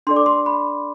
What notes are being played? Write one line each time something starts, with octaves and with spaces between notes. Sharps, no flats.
D4 A4 D5 C6
D6
C6
B5